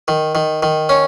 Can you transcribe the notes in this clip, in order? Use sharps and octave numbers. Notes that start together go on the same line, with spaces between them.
D#3
D#3
D#3
C#4